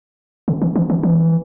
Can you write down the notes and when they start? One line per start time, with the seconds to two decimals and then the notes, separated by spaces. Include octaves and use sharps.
0.48 C#3
0.62 D#3
0.76 E3
0.90 D#3
1.03 E3